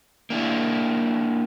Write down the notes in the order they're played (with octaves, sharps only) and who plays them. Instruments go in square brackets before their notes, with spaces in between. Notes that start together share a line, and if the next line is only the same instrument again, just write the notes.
[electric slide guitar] A#3 D4 E4